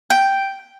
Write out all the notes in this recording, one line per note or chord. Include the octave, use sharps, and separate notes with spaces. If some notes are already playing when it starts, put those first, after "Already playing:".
G5